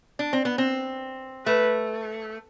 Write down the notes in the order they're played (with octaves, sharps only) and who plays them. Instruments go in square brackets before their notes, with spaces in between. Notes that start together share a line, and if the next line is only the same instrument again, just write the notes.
[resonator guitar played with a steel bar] D4
C4
B3
C4
[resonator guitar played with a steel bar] A3 [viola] B4